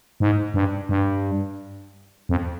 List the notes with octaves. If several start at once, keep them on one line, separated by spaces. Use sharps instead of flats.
G#2
G2
G2
F2